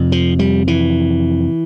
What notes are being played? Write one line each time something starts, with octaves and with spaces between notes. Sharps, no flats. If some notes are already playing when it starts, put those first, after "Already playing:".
Already playing: F2 C3
F3
G3
E3